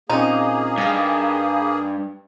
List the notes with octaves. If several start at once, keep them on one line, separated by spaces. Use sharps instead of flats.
A#2 A#3 C4 C#4 D#4 G#4
G2 F5 G#5